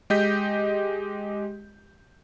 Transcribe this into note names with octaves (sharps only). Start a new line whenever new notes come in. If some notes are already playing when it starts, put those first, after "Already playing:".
G#3 G4 D#5 G6 B6